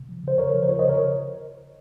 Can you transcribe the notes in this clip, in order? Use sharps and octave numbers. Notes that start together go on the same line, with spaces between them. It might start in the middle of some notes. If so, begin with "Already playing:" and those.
Already playing: C3
F3
C#3 C5
C#3 A#4 C#5
F3
C5
F4 A#4 C#5
C5 D#5
C#3
A#4 C#5